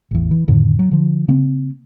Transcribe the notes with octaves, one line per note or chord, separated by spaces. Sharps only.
A1 E2
E3
F2 A2 D3 D#3
F#3
D3 F3
C#3 A#3 C4